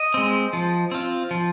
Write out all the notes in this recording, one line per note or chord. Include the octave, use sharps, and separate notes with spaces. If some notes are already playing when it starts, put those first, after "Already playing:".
Already playing: D#5
G#3 C4
F3
C4 F4
F3